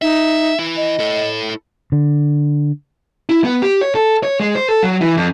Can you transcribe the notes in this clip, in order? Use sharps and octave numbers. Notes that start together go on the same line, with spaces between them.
D#4 E5
E3 E4
D#5
E4 A4
D3
E4
B3
G4
C#5
A4
C#5
G#3
C5
A4
F#3
E3
F2